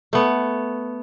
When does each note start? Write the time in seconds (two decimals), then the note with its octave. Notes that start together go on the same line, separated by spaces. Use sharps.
0.13 A3 B3